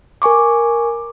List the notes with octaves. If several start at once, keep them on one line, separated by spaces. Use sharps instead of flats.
A#4 G#5 C#6 D6